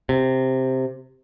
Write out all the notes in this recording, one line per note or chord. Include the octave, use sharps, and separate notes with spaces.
C3